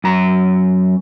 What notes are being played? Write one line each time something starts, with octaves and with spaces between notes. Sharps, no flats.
F#2 A#5